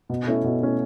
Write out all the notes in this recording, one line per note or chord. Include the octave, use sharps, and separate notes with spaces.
B2
A3 C#4 E4
B2
A3 C#4 E4